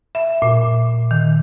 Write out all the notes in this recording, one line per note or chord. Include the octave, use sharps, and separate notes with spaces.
E5
A#2
D#3